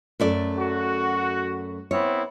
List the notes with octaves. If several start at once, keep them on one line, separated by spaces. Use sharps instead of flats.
F#2 A3 D5
F#4
B3 C4 E4 C#5